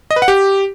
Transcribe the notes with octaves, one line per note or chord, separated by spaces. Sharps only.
D#5
B4
F#5
G4